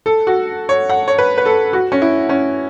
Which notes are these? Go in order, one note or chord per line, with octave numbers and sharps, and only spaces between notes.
A4
F#4
C#5
F#5
C#5
B4
B4
A4
F#4
C#4
E4
C#4